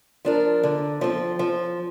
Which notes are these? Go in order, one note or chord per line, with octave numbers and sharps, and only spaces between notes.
F3 D4 A#4
D3
F3 C4
F3